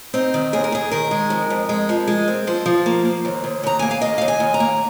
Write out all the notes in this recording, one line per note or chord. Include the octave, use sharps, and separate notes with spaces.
C4 D#4
D#3
D#2 G#4
A#4
D#2 G#4
D#3 A#4
G#3
F2
F2
G#3
F3
G#3
C4
F3 C5
F3
A#3
A#3
D#2
D#2
D#2 A#5
A#3 G#5
F5
D#2 D#5
D#2 F5
G#5
D#2
A#5
A#3